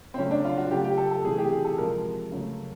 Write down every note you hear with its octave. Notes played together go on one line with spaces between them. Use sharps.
C4
C#3 F#3 A3 C#4
D4
F4
F#4
C#3 F#3 A3 G4
G4
A4
A4
C3 E3 A3 G#4
G4
G#4
A4
C3 F3 G#3 A#4
C#3 F#3 A3